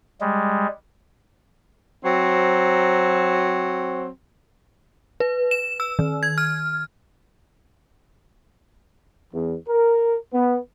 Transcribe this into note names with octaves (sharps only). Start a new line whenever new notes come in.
G3 G#3
F#3 C4
B4
E7
E6
D#3
G#6
F6
E2
A#4
B3